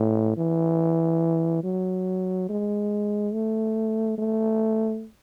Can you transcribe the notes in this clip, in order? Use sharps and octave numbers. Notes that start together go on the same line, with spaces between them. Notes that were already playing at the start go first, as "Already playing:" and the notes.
Already playing: A2
E3
F#3
G#3
A3
A3